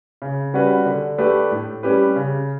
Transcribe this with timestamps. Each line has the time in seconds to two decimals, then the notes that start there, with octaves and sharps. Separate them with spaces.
0.22 C#3
0.54 G3 C#4 F#4 B4
0.86 D3
1.18 A3 D4 G4 B4
1.51 A2
1.83 G3 C#4 G4 B4
2.16 C#3